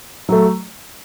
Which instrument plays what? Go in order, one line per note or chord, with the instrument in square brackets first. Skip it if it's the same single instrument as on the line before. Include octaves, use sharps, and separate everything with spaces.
[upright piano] F#3 A3